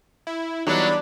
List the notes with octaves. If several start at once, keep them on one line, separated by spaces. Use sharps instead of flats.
E4
E3 F#3 G3 B3 D4 D#4 C#5 B5